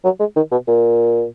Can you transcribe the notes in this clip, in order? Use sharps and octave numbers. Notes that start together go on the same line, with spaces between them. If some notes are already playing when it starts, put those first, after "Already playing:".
F#3
G#3
D#3
B2
A#2